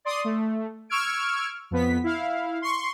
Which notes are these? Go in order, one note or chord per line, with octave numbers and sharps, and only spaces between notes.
D5 C6 D#6
A3
C#6 E6 F6 G#6 D7
F2 B3 B6
E4 F5
C6 C#6